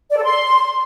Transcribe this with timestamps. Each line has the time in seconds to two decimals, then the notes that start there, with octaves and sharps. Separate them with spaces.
0.11 D5
0.17 A4
0.23 C6